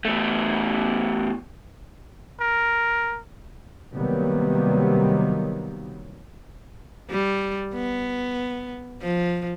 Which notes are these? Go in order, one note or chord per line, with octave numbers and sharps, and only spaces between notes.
E2 A3
A#4
C3 D#3 F#3 G3 A#3 B3
G3
B3
F3